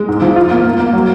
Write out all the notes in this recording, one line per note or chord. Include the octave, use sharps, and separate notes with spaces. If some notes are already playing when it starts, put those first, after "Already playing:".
Already playing: G#3
G#2
F3
F4
A#3
A#3
A#3
F#3